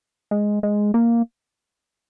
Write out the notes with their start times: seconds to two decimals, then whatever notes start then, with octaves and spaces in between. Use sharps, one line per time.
0.31 G#3
0.63 G#3
0.94 A#3